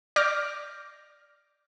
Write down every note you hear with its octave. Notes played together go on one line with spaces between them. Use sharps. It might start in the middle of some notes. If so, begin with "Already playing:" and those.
D5 D6 F6 G6 A#6